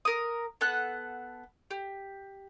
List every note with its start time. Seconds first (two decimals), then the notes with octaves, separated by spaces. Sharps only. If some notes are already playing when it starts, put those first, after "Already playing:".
0.05 A#4 D#6
0.61 B3 A4 F#5 F#6
1.71 G4